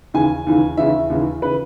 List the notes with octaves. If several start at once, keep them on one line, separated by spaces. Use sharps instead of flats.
D#2 C#3 E3 G#5
D#2 C#3 E3
D#2 C#3 E3 E5
D#2 C#3 E3
C#3 E3 B4